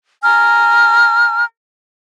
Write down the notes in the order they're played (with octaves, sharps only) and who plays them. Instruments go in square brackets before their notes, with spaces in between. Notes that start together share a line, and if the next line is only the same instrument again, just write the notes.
[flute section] G#5 A#5 F6